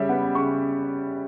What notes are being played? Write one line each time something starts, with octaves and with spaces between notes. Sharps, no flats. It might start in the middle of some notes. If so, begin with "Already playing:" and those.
Already playing: C#3 G3 G4 C#5 E5
B3 F#5
C#3 C#6